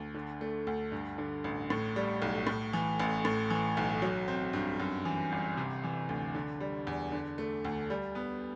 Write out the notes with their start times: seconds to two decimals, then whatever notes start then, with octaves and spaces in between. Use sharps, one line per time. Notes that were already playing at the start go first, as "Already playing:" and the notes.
Already playing: D2
0.14 D3
0.41 A3
0.67 D2
0.92 G2
1.18 D3
1.44 A1
1.70 A2
1.96 G3
2.22 B1
2.47 A2
2.73 E3
3.00 A1
3.25 A2
3.50 E3
3.77 B1
4.02 F#3
4.28 C4
4.53 G2
4.80 F#2
5.05 E3
5.32 G1
5.57 C3
5.84 E3
6.09 D2
6.34 D3
6.60 G3
6.87 E2
7.12 D3
7.38 A3
7.65 D2
7.90 G3
8.15 B3